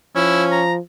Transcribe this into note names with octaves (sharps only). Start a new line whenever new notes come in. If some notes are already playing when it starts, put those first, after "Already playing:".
F3 C#4 E4
A#5